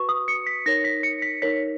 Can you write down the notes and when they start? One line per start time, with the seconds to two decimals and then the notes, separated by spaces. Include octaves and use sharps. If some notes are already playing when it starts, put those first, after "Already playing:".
Already playing: F#4 B4 C#6
0.09 D#6
0.28 C#7
0.46 B6
0.66 D#4 A#4 C#5 A#6
0.84 B6
1.03 C#7
1.22 B6
1.42 D#4 A#4 C#5 B6